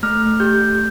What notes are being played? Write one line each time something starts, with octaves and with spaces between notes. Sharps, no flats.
A3 F6
G4 G6